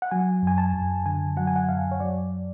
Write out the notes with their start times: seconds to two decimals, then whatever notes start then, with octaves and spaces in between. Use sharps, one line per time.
0.02 F#5
0.11 F#3 G#5
0.43 F#2 G#5
0.58 A5
0.74 F#2
1.06 D3 G#5
1.37 F#3 F#5
1.47 G#5
1.56 F#5
1.69 F#2 F5
1.91 C#5
2.00 F#3 D5